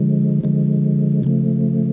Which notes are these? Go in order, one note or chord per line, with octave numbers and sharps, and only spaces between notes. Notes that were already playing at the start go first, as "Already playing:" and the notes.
Already playing: D3 F3 G#3
D3 F3 G#3
C#3 F3 A3